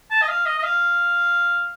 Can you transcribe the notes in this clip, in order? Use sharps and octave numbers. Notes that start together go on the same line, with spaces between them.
A5
D#5
F5
D#5
D#5
F5